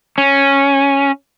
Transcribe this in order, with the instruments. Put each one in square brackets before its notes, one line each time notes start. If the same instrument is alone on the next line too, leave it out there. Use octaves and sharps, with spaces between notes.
[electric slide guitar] C#4